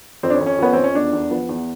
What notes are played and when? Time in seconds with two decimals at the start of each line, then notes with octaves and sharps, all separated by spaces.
0.23 F2 C4
0.30 D4
0.34 C#4
0.41 F2
0.46 C#4
0.59 F2 B3
0.73 F2 C4
0.84 C#4
0.94 E2 D4
1.13 E2
1.31 F3 B3
1.49 E2